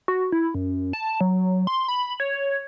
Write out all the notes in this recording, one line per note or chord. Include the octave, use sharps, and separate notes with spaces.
F#4
E4
F#2
A5
F#3
C6
B5
C#5